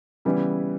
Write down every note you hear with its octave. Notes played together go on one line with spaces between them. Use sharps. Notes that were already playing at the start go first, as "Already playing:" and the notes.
C#3 E3 G3 B3 E4